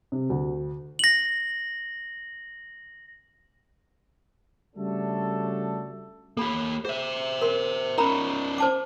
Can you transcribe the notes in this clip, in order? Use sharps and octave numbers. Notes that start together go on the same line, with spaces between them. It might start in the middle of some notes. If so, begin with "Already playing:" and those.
C3
D2
A#6 F#7
C#3 G3 A3 D4 F#4 A4
A#3 G4 A4 B5
G#4 C5 E5
A#4 C6
C#4 D#4 A#4 A#5 B5
C5 A5 D6